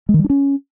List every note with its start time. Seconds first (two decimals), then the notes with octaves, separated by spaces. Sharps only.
0.09 G#3
0.14 D#3
0.19 G3
0.24 D4
0.30 C#4